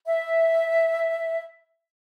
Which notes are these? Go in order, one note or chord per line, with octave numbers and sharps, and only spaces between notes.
E5